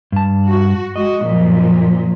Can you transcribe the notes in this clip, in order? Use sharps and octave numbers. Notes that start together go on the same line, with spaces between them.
G2 A5
F#4
G#3 F#4 D#5
F#2 A#2 F3